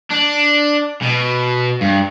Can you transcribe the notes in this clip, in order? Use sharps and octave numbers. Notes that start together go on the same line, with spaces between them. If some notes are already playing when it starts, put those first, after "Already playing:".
D4
B2
G2